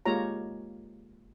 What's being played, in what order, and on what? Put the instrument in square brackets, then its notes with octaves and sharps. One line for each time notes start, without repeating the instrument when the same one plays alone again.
[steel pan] G#3 A#3 F4 G4 C#5 A#5